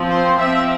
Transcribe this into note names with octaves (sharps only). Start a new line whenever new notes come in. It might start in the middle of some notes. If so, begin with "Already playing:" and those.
Already playing: F3 C4
C5
F3 C4 E5